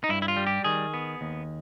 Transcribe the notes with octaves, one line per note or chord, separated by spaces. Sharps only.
D#4
G2 E4
E4
F4
G3
G4
D#3 G#4
B3
D#2